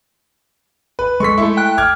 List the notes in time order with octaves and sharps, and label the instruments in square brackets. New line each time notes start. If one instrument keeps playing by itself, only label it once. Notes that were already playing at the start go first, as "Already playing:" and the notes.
[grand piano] B4
[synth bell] G#3 A4 [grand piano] C#6 B6
[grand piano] A3 E4
[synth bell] G5 F#6
[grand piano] D6 F6 G#6